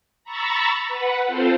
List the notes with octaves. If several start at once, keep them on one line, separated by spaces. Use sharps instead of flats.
A#5 B5 C#6 E6 A6
B4 F#5
C4 F4 A4 C5